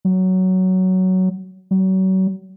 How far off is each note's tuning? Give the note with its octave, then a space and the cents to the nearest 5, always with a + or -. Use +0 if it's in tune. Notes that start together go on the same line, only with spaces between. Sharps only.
F#3 +10
F#3 +35